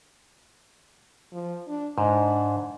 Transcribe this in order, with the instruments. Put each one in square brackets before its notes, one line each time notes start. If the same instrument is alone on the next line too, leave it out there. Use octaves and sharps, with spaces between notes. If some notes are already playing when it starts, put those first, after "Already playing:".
[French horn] F3
D4
[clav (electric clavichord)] G#2 [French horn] D4